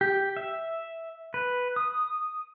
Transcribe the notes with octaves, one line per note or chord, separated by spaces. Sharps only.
G4
E5
B4
D#6